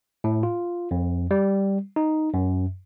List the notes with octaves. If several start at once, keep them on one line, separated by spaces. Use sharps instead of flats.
A2
F4
F2
G3
D#4
F#2